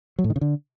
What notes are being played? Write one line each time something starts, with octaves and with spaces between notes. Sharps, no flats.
F#3
A2
D#3
C#3
D3